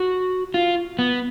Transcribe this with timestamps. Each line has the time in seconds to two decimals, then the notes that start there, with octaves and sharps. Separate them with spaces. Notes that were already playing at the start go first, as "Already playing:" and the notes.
Already playing: F#4
0.54 F4
0.99 B3